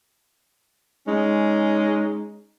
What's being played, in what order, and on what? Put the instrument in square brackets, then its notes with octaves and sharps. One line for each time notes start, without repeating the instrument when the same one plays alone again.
[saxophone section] G#3 C#4 D#4